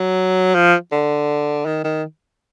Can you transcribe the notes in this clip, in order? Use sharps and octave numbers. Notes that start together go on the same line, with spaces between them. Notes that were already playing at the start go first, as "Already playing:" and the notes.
Already playing: F#3
F3
D3
D#3
D#3